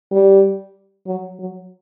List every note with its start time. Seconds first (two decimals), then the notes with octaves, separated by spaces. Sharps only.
0.12 G3
1.06 F#3
1.39 F#3